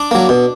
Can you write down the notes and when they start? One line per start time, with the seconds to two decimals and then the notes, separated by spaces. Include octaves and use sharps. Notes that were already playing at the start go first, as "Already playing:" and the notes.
Already playing: D4 D5
0.11 F#3 A#3
0.29 B2